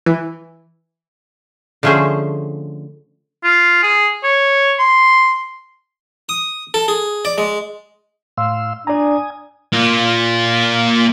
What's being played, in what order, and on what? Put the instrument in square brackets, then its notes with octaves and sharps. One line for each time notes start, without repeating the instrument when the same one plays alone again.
[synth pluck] E3
[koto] D3 F3 A3 C#4 G#4 C5
[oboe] F4
G#4
C#5
C6
[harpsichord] D#6
A4
G#4
D5
G#3
[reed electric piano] A2 [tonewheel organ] F5 C6 E6
[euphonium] D4 [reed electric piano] D5 A#5 [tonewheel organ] G#5 D#6
[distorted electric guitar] A#3 F4